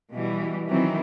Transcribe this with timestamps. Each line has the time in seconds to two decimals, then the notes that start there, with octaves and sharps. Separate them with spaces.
0.12 B2 E3 G3
0.67 D#3 E3 F#3 C4